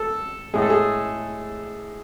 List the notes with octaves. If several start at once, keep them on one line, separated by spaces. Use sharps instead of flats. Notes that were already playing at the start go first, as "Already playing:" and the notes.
Already playing: A4
A2 G#3 G#4
A4
G#4